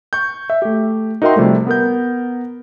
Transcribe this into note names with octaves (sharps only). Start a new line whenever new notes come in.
C#6 G6
E5
A3 G4
D#4 F#4 A#4 E5 G5 C6
C3 F3 G3 A3
B3 A#4 G6